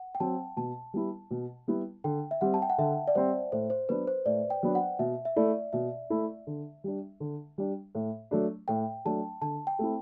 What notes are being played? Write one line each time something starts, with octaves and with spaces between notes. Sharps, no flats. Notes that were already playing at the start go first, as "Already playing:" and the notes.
Already playing: F#5
G5
F#3 C4 A5
B2 A5
G3 B3 E4
B2
G3 B3 E4
D3 G5
E5
G3 C4 F#5
A5
G5
F#5
D3 E5
D5
G3 C4 C5
A2 C5
C5
F#3 B3 D4 B4
C5
A2 D5
G5
F#3 B3 D4
F#5
B2 E5
E5
A3 E4 D5
B2 E5
A3 E4
D3
G3 D4
D3
G3 D4
A2
F#3 A3 D4
A2 G5
F#3 A3 D4 A5
D3 A5
G5
A3 C4 E4